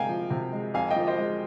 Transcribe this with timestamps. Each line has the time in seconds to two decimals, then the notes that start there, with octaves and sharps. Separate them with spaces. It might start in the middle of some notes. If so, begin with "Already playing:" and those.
Already playing: C3 G#3 F5 G5 G#5 A#5
0.09 F3
0.30 C3
0.53 G#3
0.74 F2 F5 G#5
0.91 D#5 G5
0.96 F3
1.07 C5 D#5
1.19 G#3